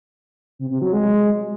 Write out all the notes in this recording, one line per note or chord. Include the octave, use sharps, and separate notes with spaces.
C3
C3
F#3
G#3